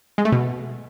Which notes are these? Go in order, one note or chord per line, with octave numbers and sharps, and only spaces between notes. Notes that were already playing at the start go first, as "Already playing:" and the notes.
G#3
A3
B2